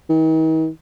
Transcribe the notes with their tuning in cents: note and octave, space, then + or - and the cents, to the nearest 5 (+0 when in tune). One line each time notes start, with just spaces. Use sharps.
D#3 +45